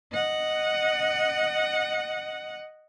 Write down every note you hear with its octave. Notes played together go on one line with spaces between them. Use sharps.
D#5 F#5